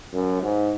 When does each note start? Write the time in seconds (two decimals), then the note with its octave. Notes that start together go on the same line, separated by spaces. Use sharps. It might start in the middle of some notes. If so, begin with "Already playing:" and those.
0.13 F#2
0.42 G#2